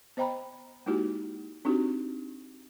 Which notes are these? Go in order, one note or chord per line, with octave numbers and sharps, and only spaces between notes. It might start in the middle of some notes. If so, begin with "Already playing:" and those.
B3 C5 D#5 G5 A#5 B5
G#3 A#3 D#4 E4 F#4 G4
C4 D4 D#4 F#4 G4